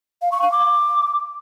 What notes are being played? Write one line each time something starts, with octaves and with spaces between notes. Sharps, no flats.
F5
C#6
F5
D6